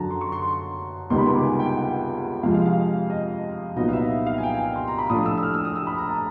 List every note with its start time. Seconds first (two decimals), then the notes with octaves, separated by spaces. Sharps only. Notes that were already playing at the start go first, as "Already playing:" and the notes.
Already playing: F#2 D3 F#3 A5 A#5
0.11 C6
0.21 C#6
0.32 C6
1.10 C#2 C3 D#3 G3 B3 C6
1.18 B5
1.27 C6
1.35 D6
1.43 G#5
1.60 G5
1.77 F#5
2.43 F2 C3 F3 G#3 F5
2.54 F5
2.65 F5
3.10 D#5
3.76 C2 A#2 F#3 B3 D#4 D#5
3.88 F5
3.93 E5
4.10 E5
4.26 F5
4.38 G#5
4.43 G5
4.54 G#5
4.76 C6
4.88 A#5
4.98 B5
5.09 A2 F3 A3 D4 D#6
5.26 E6
5.38 E6
5.43 F6
5.54 E6
5.65 D#6
5.76 E6
5.87 B5
5.98 A#5
6.09 A5